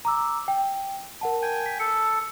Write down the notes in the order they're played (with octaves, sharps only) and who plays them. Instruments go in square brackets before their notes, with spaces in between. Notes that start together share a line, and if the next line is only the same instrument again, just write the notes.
[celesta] A#5 D6 E6
G5
A#4 F#5 A5
[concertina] G5 G#5
[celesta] B6
[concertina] A4 [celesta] C#7